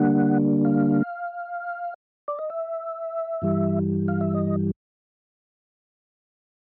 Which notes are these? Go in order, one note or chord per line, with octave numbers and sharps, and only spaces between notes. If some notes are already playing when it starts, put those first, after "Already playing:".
Already playing: D3 G3 A#3 D4 F#5
F5
D5
D#5
E5
G2 E3 G3
F5
E5
D#5